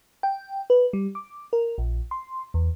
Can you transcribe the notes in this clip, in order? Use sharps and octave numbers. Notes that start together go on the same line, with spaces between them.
G5
B4
G3
D6
A#4
A#1
C6
E2